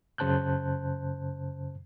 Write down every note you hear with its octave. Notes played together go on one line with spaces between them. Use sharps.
F#2 C#3 C5 A5 F#6 G6